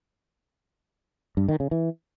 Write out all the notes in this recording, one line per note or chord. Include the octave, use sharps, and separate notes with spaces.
G2
D#3
C#3
E3